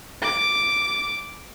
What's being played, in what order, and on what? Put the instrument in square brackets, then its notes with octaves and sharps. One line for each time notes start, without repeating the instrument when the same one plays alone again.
[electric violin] D6